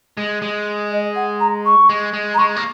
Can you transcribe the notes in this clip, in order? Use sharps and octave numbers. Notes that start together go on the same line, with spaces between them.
G#3
G#3
D#5
F#5
A#5
C#6
G#3
G#3
A#5
G#3 C#6
A#3